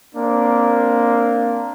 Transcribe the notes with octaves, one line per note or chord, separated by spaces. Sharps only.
A#3 C4 D4